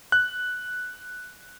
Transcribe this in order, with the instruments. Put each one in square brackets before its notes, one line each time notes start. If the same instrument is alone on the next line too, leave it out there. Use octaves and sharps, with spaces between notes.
[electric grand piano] F#6